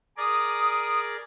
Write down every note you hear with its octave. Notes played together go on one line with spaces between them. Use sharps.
G#4 A#4 D5 D#6